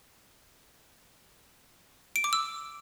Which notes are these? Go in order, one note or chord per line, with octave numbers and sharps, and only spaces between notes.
D7
D6
E6